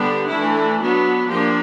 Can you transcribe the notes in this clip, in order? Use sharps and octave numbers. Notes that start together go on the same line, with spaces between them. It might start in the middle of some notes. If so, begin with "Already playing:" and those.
Already playing: D3 G3 B3 D4
E3 A3 D4 E4
F#3 B3 D4
F3 A#3 D4 G4